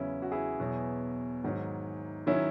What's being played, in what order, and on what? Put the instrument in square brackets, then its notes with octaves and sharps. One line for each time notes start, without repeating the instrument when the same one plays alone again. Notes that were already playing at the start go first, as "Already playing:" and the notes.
Already playing: [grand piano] E2 C#3 F#3 C#4 E4
F#4
E4 G#4
E2 B2 F#3
G#2 D#3 F#3
D#3 F#3 C#4 E4